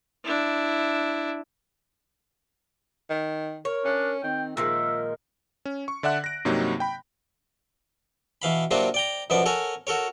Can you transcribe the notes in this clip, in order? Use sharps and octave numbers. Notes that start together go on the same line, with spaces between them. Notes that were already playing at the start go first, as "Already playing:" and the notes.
D4 E4
D#3
A#4 C#5
C#4 D4
D#3 C4 G5
A#2 D#3 F3 G#3 A#4 E5
C#4
C#6
D3 D5 E5 F#5 F#6
A#6 D7
G2 C3 F#3 A#3 D#4
G5 B5
B2 E3 F5 B5
C3 F#3 A#3 D4 F4 F#4
D5 G5 A#5
F#2 B2 F3 B3 D5
A4 A#4 C#5 F#5 G#5
F#4 A4 A#4 C#5